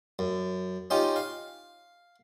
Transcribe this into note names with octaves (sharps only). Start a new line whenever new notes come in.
F#2
C#4 D#4 F4 G4
F5